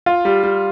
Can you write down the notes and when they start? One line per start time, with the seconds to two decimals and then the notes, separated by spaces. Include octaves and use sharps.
0.06 F4
0.25 G3
0.43 G3